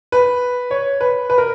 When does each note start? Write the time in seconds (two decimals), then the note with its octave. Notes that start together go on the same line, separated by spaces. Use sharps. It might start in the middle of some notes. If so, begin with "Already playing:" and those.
0.12 B4
0.71 C#5
1.01 B4
1.30 B4
1.38 A#4